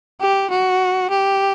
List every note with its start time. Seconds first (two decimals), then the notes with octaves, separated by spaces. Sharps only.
0.21 G4
0.51 F#4
1.10 G4